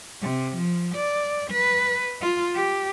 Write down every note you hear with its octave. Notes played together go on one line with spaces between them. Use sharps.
C3
F3
D5
B4
F4
G4